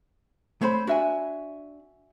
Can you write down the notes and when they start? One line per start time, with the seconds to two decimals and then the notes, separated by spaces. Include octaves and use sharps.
0.61 A3 C4 C5 C#5 B5
0.87 D4 F#4 E5 G#5